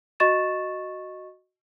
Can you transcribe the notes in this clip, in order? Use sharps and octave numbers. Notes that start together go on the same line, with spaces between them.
F#4 D#5 C#6 A6 E7